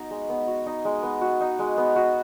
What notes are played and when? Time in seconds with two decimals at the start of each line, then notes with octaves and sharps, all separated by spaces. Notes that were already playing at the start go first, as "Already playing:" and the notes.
Already playing: B3 D#4 F#4
0.11 G#3
0.29 B3
0.48 F#4
0.66 D#4
0.85 G#3
1.03 B3
1.21 F#4
1.41 D#4
1.59 G#3
1.77 B3
1.96 F#4